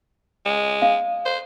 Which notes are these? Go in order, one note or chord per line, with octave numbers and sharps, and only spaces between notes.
G#3
F5
C5